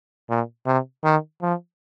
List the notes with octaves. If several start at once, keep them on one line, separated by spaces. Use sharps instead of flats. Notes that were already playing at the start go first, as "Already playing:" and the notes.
A#2
C3
D#3
F3